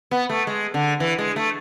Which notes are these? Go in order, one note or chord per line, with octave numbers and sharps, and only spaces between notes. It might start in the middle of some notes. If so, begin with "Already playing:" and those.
B3
A3
G#3
D3
E3
G#3
A3